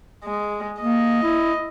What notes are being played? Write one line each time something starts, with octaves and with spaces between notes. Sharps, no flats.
G#3
A#3 D#5
E4